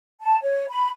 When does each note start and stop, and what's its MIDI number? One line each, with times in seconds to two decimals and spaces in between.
0.22 0.36 81
0.42 0.65 73
0.69 0.89 83